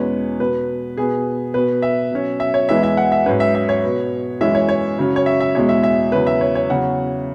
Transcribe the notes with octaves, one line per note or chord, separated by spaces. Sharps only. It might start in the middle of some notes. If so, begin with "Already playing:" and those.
Already playing: E2 B2 G#3 C#4 B4
B2 B3 B4
B2 B3 G#4
B2 B3 B4
E5
B2 F#3 C#4
E5
C#5
E2 E3 G#3 B3 E5
E5
F#5
E5
G#2 F#3 C#4 B4
E5
E5
C#5
B2 B3
F#2 E3 G#3 C#4 E5
C#5
C#5
F#2 C#3 F#3 C#4
C#5
E5
E5
E2 B2 G#3 C#5
E5
E5
E2 C#3 F#3 C#4 B4
E5
C#5
C#5
E2 C#3 F#3 C#4 F#5